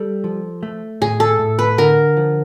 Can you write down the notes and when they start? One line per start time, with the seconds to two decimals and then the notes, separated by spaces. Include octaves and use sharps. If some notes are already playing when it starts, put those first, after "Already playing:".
Already playing: G3 A4
0.24 F3
0.63 A3
1.01 A2 G#4
1.20 A4
1.39 A2
1.59 B4
1.78 D3 A#4
2.17 F3